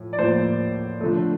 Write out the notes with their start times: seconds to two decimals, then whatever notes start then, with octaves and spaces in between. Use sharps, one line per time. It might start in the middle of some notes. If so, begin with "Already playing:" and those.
Already playing: A2 F3
0.13 D5
0.18 A2 F3 A#3 C5
1.01 D3 F3 A3